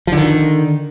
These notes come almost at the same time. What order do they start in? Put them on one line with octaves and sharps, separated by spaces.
F3 D3 D#3